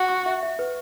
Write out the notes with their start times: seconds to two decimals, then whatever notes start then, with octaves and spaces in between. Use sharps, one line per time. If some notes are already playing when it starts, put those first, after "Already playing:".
Already playing: F#4
0.09 C#6
0.26 E5
0.43 E5
0.59 B4